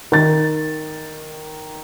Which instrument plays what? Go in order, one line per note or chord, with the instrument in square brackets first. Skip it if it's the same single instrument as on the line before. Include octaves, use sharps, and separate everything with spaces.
[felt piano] D#3 A6